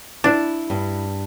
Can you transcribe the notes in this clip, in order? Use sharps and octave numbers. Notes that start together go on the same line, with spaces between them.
D4 E4
G2